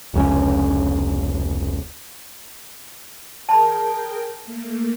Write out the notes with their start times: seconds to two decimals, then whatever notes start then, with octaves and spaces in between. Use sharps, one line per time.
0.14 F1 C#2 C#4
3.49 G#4 A#4 G5 A5 B5
4.44 A3 A#3